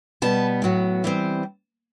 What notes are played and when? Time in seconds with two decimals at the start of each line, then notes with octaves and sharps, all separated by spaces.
0.22 B2 G3 B3 A5
0.62 A2 F#3 B3
1.04 E3 G3 C4